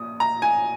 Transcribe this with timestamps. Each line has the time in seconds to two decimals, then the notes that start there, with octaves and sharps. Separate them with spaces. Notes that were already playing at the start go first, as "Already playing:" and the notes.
Already playing: A#1 D#6
0.20 A#5
0.42 G#5